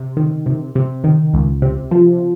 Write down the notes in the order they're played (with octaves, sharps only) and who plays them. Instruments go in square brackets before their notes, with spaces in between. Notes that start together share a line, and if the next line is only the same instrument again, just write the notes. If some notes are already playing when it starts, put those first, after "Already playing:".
Already playing: [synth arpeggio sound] C3
D#3
C3
C3
D#3
C#2
C3
F3